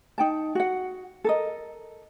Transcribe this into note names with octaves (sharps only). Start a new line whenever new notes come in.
D#4 G5 A5
F#4 F#5
A4 A#4 D#5